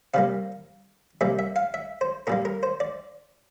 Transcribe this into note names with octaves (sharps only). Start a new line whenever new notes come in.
C3 G3 A#3 F5
C3 G3 A#3 E5
E5
F5
E5
C5
A#2 G3 A#3 A#4
A#4
C5
D5